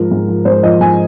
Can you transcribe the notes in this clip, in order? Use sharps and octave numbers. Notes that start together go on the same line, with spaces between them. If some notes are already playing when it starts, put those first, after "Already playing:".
Already playing: G#2 F3 A#4
G#2
F3
G#2 C5
F3 D#5
G#2 G#5